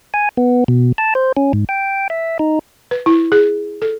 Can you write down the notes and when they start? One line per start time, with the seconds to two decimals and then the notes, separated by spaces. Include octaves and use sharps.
0.14 G#5
0.37 B3
0.68 B2
0.98 A5
1.15 C5
1.37 C#4
1.53 G#2
1.69 G5
2.10 E5
2.39 D#4
2.91 B4
3.06 E4
3.32 G#4
3.82 A4